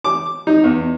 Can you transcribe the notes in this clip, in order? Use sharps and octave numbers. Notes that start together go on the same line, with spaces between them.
D6
D#4
E2